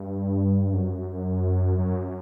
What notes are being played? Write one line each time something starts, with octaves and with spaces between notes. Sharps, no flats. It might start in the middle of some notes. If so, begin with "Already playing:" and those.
Already playing: G2
F#2
F#2